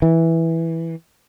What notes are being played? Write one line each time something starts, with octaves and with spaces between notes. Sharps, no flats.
E3